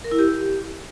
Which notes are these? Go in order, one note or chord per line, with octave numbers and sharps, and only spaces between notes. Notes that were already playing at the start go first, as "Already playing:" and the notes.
A#4
E4
G4